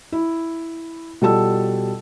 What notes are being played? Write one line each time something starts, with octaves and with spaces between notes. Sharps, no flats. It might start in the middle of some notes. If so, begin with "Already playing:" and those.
E4
B2 G3 F4 A4 A5 E6